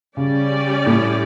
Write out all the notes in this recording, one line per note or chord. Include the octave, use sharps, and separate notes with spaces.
C#3 G3 C#4 G4 D5
A2